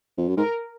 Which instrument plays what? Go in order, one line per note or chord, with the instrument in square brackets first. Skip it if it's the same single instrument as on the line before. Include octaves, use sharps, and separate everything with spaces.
[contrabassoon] F2
F#2
[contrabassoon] G#2 [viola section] A#4